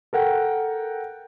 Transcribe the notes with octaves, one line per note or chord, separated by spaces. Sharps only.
A4 A#4 F#5 G5